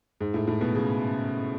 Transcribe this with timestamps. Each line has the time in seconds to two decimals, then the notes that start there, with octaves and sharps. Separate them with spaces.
0.21 G#2
0.34 A2
0.48 A2
0.61 B2
0.75 C#3